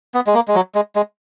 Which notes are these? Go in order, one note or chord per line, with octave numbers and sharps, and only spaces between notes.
B3
G#3
A#3
G#3
F#3
G#3
G#3